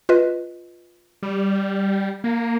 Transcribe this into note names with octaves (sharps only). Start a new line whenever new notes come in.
F4 B4 D#5
G3
A#3